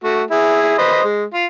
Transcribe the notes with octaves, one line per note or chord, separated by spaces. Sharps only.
A3 F#4
E4 G#4
B4 C5 D#5
G#3
F4